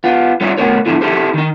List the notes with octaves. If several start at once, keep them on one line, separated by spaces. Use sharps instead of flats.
B3 F4
G3 D#4 F4 C#5 D5 E5
B2 A3 B3 A#4 C#5
E2 A2 D3 E3 F3 A3
D#4 E4 G4 A4 C5
D#3 D#4